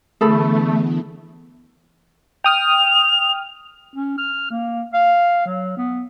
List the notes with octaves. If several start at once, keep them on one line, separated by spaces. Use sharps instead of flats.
D3 E3 A3 B3 G#4 A4 B5
G5 D#6 F6 F7
C#4
F6
A#3
F5
F#3
B3